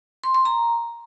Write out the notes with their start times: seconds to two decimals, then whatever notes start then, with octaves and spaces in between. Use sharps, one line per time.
0.24 C6
0.34 C6
0.45 A#5